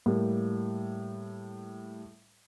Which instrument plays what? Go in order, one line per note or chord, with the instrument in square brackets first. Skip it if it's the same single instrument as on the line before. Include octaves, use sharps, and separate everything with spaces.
[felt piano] A2 G3 A#3